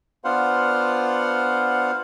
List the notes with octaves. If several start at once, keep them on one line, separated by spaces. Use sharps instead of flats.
B3 D4 F4 C5 F5 F#5